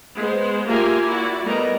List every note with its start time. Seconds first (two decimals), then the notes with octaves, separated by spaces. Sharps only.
0.16 G#3 B3 C5
0.67 A#3 F4 G4 A#4 E5 G#5
1.08 E4 F#4 D5
1.43 G3 A3 B3 A#4 D#5 A#5